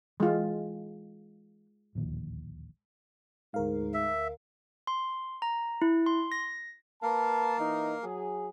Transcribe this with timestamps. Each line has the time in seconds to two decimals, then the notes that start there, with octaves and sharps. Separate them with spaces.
0.20 E3 G#3 F4
1.95 D1 A#1 D#2
3.54 D2 G#2 A#4 F5
3.94 E5
4.87 C6
5.42 A#5
5.82 E4
6.06 C6
6.32 A#6
7.03 A#3 A#4 B4 F5 A5
7.58 E3 D#4
8.04 F#3 G#4